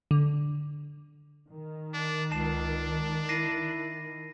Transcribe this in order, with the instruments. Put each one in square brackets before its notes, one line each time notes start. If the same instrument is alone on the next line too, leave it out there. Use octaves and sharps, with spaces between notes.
[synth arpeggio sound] D3
[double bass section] D#3
[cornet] D4
[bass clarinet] C#2 [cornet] D4 [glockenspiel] A5 C7 E7
[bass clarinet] E4 [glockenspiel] A#6 C7 D#7